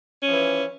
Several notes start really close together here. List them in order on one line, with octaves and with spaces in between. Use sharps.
C#4 F3 E3